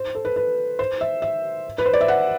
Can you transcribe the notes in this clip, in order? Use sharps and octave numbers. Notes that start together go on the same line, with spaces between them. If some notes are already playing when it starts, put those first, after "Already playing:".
Already playing: C5
A4
B4
B4
C5
E5
E5
B4
C5
D5
E5
F#5